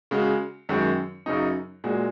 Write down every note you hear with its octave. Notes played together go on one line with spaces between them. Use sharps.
C#3 G#3 F#4
F#2 D#3 G#3 F#4
F#2 C#3 F#3 D#4
A#2 G#3 F#4